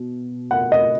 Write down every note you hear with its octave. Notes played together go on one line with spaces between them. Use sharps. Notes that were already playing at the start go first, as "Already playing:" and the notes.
Already playing: B2
F#5
D#5